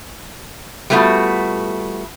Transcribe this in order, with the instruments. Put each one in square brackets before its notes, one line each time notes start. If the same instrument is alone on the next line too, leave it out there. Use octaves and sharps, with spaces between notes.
[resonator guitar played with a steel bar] G3 A3 B3 F4 F#4